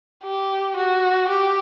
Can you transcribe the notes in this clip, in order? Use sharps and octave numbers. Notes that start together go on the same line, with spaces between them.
G4
F#4
G4